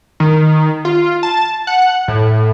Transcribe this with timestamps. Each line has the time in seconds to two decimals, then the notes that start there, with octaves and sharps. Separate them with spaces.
0.20 D#3
0.85 F4
1.23 A5
1.67 F#5
2.08 A2